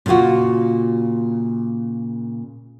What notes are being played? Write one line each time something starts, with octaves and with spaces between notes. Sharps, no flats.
A#2 C#3 A#3 F4 F#4